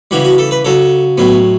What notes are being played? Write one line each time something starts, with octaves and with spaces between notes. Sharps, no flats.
C#3 E3 G3 F#4
F#4
A4
B4
C#3 F#3 A4
A2 F#3 B3